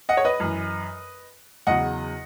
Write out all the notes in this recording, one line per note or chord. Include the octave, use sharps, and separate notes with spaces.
D#5 F#5
C#5
B4 D#5
F#2 E3
E2 C#3 F#3 D#5 F#5